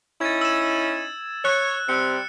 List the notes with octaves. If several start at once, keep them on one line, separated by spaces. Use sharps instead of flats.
C#4 D#4 E4 G#6 A6
E6 E7
C#5 F#6
C3 G3 C4 C#7